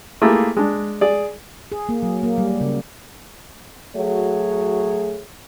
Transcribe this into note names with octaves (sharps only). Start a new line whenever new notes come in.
A3 A#3 E4 F4 G4 G#4
G#3 D4
G#4 D5
G#4
A#3
F#3
A#3
G3
C#3
F#3 A3 F#4 G#4 C#5